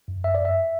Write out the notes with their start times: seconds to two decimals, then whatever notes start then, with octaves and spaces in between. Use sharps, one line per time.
0.08 F#2
0.24 F#2 E5
0.35 D5
0.40 F#2
0.45 E5